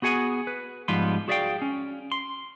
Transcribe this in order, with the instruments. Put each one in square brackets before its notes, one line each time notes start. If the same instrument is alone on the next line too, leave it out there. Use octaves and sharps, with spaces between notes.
[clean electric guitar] B3 F#4 G#4 F#5 G#5
B4
G#2 F3 G3 B3 B4 C6
F#4 G#4 D5 E5 F5 G5
C#4
C6